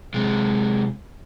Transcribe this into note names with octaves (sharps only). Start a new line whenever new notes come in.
C3 G#3